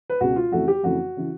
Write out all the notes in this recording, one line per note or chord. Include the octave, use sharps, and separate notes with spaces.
B4
C#2 B2 G#3 F#4
F4
F2 C#3 E3 A3 F#4
G4
F2 C#3 E3 A3 F#4
C#3 E3